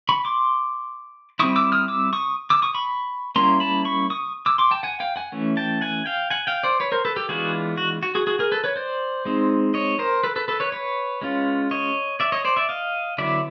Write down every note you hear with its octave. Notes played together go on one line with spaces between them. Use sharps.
B5 C#6
C6 D6
G3 C4 E4 C#6 D#6
D6 E6
D#6 F6
D6 E6
C#6 D#6
D6 E6
C#6 D#6
B5 C#6
G3 A#3 C#4 E4 A#5 C6
A5 B5
B5 C#6
C#6 D#6
D6 E6
C6 D6
G5 A5
F#5 G#5
F5 G5
F#5 G#5
E3 A3 C#4
G5 A5
F#5 G#5
F5 G5
F#5 G#5
F5 G5
C5 D5
B4 C#5
A#4 C5
A4 B4
G4 A4
E3 G#3 B3 D4 F4 F#4 G#4
F#4
F#4
F#4 G#4
F#4 G#4
G#4 A#4
A4 B4
B4 C#5
C5 D5
G#3 C4 D#4
C#5 D#5
A#4 C5
A4 B4
A4 B4
A4 B4
B4 C#5
B4 C#5
G#3 C#4 F4
C#5 D#5
D5 E5
C#5 D#5
C5 D5
D5 E5
D#5 F5
D3 F#3 B3 E4 D5 E5